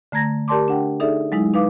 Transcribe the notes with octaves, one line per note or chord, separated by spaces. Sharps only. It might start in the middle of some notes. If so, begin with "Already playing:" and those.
D3 A3 A#5 G#6 A#6
G4 A#4 D5 A5 C6 D6
D4 F#5 G5
D#4 G#4 A4 D5 E5
F#3 G#3 D#4 E4
D#4 B4 F5 D6